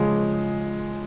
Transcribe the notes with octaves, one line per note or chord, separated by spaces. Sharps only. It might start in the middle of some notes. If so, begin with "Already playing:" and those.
Already playing: C#3 F3 G#3